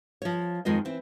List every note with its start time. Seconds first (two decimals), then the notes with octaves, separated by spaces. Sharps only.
0.22 F3 C#5
0.65 F2 D#3 G#3 F4 D#5
0.85 E3 C4